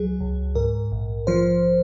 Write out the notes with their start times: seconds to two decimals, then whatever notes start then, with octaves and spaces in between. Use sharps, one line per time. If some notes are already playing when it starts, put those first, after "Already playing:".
Already playing: C#2 F#3 G#4
0.20 C#2
0.55 G#2 A#4
0.92 A#1
1.27 F3 C5